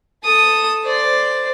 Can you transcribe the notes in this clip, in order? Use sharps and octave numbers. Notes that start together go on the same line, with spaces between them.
A4 D#6
C5 D5